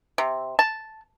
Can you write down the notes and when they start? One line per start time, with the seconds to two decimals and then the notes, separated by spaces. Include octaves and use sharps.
0.18 C3
0.59 A5